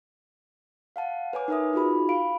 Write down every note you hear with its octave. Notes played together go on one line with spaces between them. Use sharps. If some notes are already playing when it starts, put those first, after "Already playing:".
F5 F#5 A5
B4 C#5 G#5 D6
D#4 A#4 B4 E5 D#6
D#4 F4 F#4 G#4 B5
F5 B5 D7